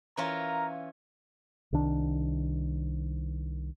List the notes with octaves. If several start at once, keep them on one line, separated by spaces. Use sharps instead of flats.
E3 C#4 F4 A#4 A#5
C2 D#3 D4